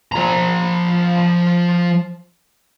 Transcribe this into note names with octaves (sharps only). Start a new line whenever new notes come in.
F3 A#5